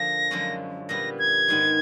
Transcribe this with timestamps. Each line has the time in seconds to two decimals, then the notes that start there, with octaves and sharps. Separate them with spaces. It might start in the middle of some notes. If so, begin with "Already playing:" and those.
Already playing: D3 F3 A#3 A#6
0.31 F#2 D3 F3 G#3 C#4
0.89 A#2 G3 B3 A#6
1.19 G#6
1.48 G#2 D#3 G#3 B3